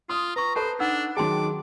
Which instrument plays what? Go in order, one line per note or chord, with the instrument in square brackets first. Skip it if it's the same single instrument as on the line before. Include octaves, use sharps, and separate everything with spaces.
[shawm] F4 [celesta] C6 [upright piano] D#6
[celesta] B4 C#6 [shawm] A#5
[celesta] A4 A5 [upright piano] B4 [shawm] C5
[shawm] D4 [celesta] D#4 F#5 E6
[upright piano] D#3 F#3 A5 [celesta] G#4 G5 C6 [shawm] D6